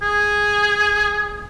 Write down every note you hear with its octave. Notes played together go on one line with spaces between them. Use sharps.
G#4